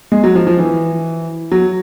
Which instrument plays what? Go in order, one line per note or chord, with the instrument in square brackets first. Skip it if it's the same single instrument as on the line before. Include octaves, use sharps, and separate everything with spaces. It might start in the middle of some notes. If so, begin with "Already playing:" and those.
[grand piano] G#3
F#3
F3
F3
E3
F#3